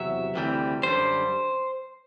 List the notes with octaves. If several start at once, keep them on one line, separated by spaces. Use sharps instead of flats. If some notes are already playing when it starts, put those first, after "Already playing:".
Already playing: E2 C3 F#3 E5
D2 C3 E3 G3
F#2 D3 G3 C5